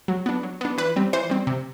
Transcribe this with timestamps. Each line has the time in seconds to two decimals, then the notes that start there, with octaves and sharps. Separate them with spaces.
0.08 F#3
0.26 B3 D4
0.43 F#3
0.61 B3 D4
0.78 E3 B4
0.96 G3 C4
1.13 E3 C5
1.30 G3 C4
1.47 C3